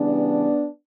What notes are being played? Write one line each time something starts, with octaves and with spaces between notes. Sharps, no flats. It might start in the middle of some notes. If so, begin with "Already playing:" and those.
Already playing: C#3 E3 G3 B3 D4